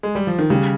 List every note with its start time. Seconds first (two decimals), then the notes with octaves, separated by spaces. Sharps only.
0.03 G#3
0.15 G3
0.27 F3
0.39 D#3
0.50 C#3 G3